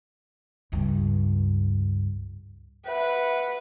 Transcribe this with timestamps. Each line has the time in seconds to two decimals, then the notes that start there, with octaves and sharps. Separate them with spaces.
0.72 C#2 G2
2.86 B4 E5 F#5